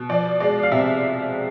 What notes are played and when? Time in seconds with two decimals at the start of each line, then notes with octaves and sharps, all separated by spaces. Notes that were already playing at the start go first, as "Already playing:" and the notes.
Already playing: B2
0.09 F3 D5
0.40 G#3 D5
0.63 F5
0.72 C3 E5